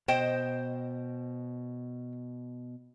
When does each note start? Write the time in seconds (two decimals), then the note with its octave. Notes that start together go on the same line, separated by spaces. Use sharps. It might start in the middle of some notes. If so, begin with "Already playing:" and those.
0.08 B2 C5 D#5 G5